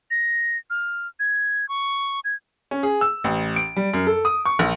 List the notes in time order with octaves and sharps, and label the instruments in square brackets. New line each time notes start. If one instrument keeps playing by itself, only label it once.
[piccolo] A#6
F6
G#6
C#6
G#6
[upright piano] C#4
G#4
E6
A1
D7
G3
F#2
A4
D#6
C#6
A#1